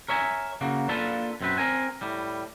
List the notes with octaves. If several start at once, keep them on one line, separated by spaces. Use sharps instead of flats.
A#4 C#5 E5 G#5
C#3 A#3 F#4
A#3 D4 F4 A4 B4 A5
F#2 C4 B4
C4 A#4 G#5
A2 G3